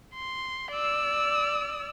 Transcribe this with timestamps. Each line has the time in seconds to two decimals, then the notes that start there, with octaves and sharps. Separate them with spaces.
0.15 C6
0.72 D5 E6